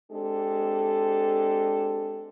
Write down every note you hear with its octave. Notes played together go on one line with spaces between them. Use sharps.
G#3 C4 D4 G4 A4